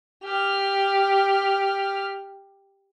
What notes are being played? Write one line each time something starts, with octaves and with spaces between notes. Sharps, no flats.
G4 F6